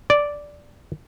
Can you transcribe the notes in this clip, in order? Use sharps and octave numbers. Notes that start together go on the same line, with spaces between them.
D5